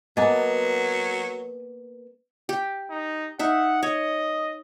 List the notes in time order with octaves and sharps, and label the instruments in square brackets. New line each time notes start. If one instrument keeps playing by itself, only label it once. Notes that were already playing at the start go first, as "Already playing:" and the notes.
[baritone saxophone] F#3 [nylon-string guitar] A#3 B3 [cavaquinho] D#5 G#5 A5
[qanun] G4
[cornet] D#4
[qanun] D#4 E5 [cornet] F#5
[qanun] C#5 [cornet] D#5